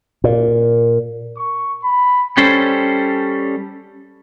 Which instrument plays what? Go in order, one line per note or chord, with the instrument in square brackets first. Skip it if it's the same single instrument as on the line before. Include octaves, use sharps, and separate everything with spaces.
[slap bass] A#2
[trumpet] C#6
B5
[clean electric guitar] G3 C#4 A4 C5